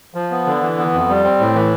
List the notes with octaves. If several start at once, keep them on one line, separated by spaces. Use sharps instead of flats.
F3
B3
D3
E3
B3
F2
G3
C4
A2
E3